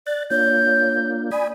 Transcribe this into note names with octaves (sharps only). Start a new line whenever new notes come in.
D5 F#6 A6
A#3 D4 F4 C#5 G6
D5 G#5 B5 D#6